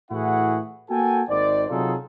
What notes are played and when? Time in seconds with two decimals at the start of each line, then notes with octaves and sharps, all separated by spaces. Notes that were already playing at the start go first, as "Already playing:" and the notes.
0.11 A2 E3 E4 F#4 G#4 F#5
0.91 A#3 F#4 A4 G5 G#5
1.29 G#1 D#3 C5 D5
1.70 C3 F#3 D#4 F4 G#4 A4